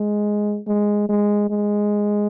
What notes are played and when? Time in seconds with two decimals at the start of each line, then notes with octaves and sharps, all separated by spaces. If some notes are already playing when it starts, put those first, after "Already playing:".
Already playing: G#3
0.67 G#3
1.09 G#3
1.50 G#3